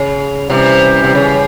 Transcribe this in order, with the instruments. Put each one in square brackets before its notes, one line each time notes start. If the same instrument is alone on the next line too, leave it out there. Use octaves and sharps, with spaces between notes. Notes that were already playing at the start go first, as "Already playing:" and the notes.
Already playing: [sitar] C#3
[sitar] C3 [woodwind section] E3 G3 C#4 G4
[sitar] C3
C#3